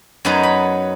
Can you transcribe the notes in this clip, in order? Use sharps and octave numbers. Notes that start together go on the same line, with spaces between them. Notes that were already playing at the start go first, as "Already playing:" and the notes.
F#2 F#3 B3 D#4 G#5
B5